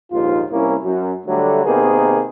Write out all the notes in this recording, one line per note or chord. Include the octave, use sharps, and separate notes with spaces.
A#1 D#2 G#2 F4
C2 A#3 C#4 E4
F#2
D3 F#3 G3 A3
C3 D#3 A#3 B3 G#4